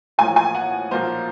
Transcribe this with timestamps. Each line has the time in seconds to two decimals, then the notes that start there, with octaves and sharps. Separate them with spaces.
0.18 A1 A2 F3 A#3 G#5
0.36 G#5
0.55 F#5
0.91 B1 A#2 F3 A#3 C5